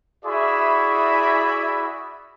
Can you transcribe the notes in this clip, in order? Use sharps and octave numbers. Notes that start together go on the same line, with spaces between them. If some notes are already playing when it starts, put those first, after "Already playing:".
E4 F#4 G#4 D5 E5 B5